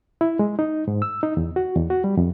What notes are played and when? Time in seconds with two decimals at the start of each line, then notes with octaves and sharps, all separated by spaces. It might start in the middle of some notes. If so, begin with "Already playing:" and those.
0.21 E4
0.39 G#3
0.59 D#4
0.88 G#2
1.02 E6
1.23 D#4
1.37 E2
1.56 F#4
1.76 E2
1.90 F#4
2.04 G3
2.17 F2